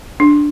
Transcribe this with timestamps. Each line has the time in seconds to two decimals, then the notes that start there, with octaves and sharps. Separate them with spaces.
0.20 D4